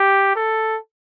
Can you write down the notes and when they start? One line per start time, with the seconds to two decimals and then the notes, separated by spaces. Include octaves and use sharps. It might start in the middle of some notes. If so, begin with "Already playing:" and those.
Already playing: G4
0.36 A4